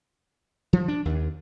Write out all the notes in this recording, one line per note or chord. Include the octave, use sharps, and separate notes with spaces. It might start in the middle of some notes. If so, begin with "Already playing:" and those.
F3
D4
D#2